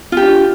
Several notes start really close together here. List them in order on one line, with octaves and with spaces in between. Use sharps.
F4 G4 D4